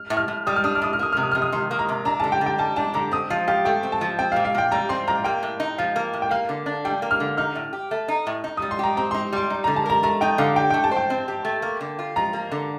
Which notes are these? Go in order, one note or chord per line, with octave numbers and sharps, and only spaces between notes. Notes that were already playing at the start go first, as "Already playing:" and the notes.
Already playing: F6
A2
F6
A2
G3 D#6
F6
D4 D#6
F6
A2 D#6
F6
A#3 D#6
C3 F6
D#6
C3 F6
D#6
D#3 C6
A#3
A#5
C3
D4 A#5
D3 A5
G5
D3
G5
G3 A5
D4 A5
D3 A#5
C4 D#6
F3 F5
G4 F5
A3 G5
C4
A5
F3
C4 G5
F5
A#2
F5
A#2 G5
G3 A#5
C4 C6
A#2 A#5
A#3 G5
A2
D#4
F3 F5
A#3
A2
G5
A#3 F5
D3
D4
G3 G5
A#3
F6
D3
D#4 F6
A2
G4
A3
D#4
A2
D#4
G3 D#6
C6
G4 A#5
C4 A#5
D#4 C6
G3 C6
D#4
D3 A#5
A5
A#4 A#5
A3 A#5
D#4 G5
D3 F5
G4 G5
A3 G5
A5
C5
G5
C4
G4
A3
A#3
D3
F4
F3 A#5
A#3
D3